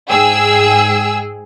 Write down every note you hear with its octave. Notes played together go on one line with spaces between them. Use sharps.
G#2 G#4 G5 E6